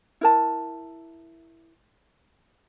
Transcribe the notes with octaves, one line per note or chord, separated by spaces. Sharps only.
E4 A#4 A5